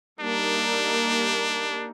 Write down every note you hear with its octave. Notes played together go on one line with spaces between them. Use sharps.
G3 A#3 D4 D#4